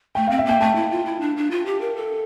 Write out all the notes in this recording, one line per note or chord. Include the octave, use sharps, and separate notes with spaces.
A3 G5
C4 F5
E5
A#3 G5
A3 A5
E4
F4
E4
D4
D4
F4
G4
A#4
A4